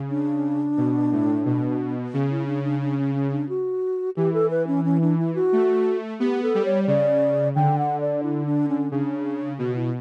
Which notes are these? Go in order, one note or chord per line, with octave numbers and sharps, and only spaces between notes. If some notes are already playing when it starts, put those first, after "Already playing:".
Already playing: C#3
D4
B2
A2
B2
C#3
E4
D4
D4
D4
C#4
C#4
D4
F#4
E3 G4
A4
B4
C#4
C#4
D4
E4
F#4
A3
B3 G4
A4
G3
C#5
C#5
C#3 D5
D3 G5
F#5
D5
E4
D4
C#4
C#3 D4
B2 F#4
E4